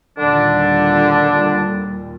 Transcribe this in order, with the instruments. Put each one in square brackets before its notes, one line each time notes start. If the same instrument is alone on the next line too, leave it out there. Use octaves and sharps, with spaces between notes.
[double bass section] D#2 A#2 G3 [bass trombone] D3 [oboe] D4